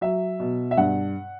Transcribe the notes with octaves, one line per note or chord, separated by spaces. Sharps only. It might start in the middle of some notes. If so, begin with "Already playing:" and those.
F#3 E5
B2
E5
G2 F#5